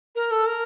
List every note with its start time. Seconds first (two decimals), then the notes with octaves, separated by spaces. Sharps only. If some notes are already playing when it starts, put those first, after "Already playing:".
0.15 A#4
0.31 A4
0.47 A#4